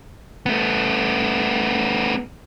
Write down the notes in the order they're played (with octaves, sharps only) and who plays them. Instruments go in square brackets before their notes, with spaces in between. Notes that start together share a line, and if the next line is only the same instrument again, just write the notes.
[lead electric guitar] A3 B3